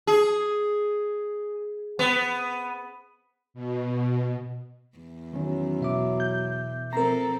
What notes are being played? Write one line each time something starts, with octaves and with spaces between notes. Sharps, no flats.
G#4
B3
B2
E2
D#3 F#3 C#4
B2 E5 D6
G6
F3 C4 A4 A#4 A#5